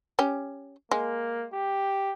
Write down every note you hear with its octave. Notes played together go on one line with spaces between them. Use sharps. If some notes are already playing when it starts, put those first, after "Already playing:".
C#4 G4
G#3 A#3
G4